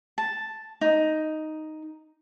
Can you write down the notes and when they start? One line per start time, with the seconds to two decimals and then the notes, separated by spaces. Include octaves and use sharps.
0.18 A5
0.81 D#4